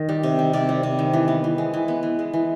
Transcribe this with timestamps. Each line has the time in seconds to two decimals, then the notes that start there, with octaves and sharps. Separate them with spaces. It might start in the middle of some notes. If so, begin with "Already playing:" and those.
Already playing: D#3
0.09 G3
0.23 C3
0.39 D#3
0.53 C3 D5
0.69 G3
0.83 C3
0.99 D#3
1.13 E3
1.28 B3
1.44 E3
1.58 G#3
1.74 E3
1.88 B3
2.03 E3
2.19 G#3
2.33 E3